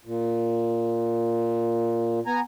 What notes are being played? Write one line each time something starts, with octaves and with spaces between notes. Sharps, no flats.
A#2
B3 G#5 A#5